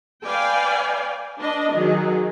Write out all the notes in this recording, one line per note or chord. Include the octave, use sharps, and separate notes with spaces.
B4 D5 F5 G5 G#5
D4 B4 D#5
D#3 F#3 G#4